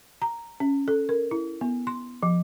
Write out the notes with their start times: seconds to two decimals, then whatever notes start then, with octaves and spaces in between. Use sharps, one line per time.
0.22 A#5
0.60 C#4
0.88 A4
1.09 A#4
1.31 E4
1.61 B3
1.87 C6
2.23 F3